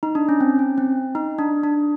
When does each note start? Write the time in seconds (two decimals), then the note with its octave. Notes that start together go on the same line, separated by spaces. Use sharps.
0.03 D#4
0.15 D4
0.29 C#4
0.40 C4
0.59 C#4
0.78 C4
1.15 D#4
1.39 D4
1.63 D4